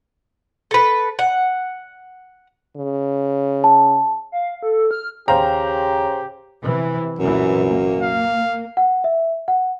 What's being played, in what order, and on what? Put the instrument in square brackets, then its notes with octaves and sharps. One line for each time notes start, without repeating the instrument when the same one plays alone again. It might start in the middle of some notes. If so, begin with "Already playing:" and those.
[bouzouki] A4 B4
F#5
[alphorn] C#3
[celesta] A5
[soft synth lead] F5
A4
F6
[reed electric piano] D#2 F5 G5 [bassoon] C#3 [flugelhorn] G4 [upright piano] C5 A#5
[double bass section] C3 E3
[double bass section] C2 A#2 E3 [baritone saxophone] F#2
[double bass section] A#3
[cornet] F5
[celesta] F#5
E5
F#5